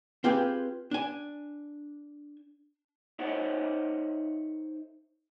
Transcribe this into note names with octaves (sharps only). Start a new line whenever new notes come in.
C4 F4 G4 G#4 B4
D4 G#5
D#4 A4 C5 C#5 E5 F#5